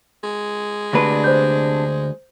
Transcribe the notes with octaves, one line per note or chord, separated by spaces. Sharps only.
G#3
D2 C3 D4 B4
C5 G6